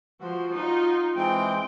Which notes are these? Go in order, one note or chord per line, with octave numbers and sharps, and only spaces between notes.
F3 F#4 C5
D#4 F4
E3 G#3 C4 G5